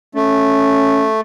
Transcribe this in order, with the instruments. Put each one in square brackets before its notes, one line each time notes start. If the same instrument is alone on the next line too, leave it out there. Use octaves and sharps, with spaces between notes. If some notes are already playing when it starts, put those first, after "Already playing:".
[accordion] A3 [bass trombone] C#4